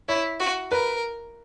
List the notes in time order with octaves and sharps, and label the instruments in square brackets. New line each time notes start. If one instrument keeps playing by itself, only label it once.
[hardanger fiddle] E4 [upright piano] C#5
[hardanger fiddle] F#4
[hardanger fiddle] A#4 [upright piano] B4